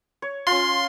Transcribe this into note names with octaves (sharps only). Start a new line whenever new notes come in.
C#5
C#4 F4 C6